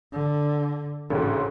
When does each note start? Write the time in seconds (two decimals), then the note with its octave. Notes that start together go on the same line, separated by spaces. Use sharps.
0.13 D3
1.10 A1 D2 G#2 C#3